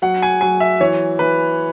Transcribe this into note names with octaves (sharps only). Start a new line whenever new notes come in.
F#3 F#5
G#5
F#3 G#5
E5
E3 C#5
E3 B4